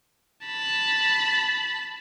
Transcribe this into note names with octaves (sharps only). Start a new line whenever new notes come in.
A5 B5